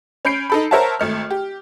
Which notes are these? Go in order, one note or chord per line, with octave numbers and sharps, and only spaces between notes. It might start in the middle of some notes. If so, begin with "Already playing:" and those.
C#4 B5 G6 C7 D7
D#4 A4 B5
A#4 C5 C#5 E5 F#5 A5
G#1 A3 F6
G4